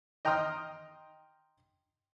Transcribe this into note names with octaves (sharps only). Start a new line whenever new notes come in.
D#5 G5 A#5 C6 D#6 F6